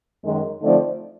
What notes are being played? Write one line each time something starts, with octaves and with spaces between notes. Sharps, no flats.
F#2 D#3 G#3
D3 F3 A3 C4 D#4 D5